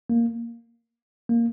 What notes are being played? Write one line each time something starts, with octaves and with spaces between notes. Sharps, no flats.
A#3
A#3